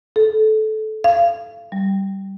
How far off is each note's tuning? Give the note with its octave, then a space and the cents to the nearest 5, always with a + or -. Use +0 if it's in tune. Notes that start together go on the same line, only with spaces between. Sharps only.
A4 -20
F5 -25
G3 -15